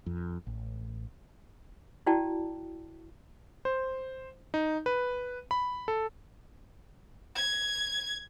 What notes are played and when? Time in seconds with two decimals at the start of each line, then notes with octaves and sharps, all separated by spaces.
0.06 F2
0.47 A1
2.07 E4 F#4 D5 G5 A5
3.65 C5
4.54 D#4
4.86 B4
5.51 B5
5.88 A4
7.36 G#6